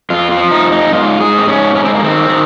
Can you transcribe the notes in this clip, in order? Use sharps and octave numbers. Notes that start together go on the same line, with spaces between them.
F2 F4
F4
F3
D#4
F2
D#4
G#2 F4
G#2 G#4
C4
G#2 C#4
G#2 C#4
C4
A#3
D#3 C4
D#3